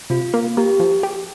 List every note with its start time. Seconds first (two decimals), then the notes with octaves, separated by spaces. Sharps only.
0.10 C3 F4
0.34 A#3
0.57 A#3 G4
0.80 F3
1.03 G4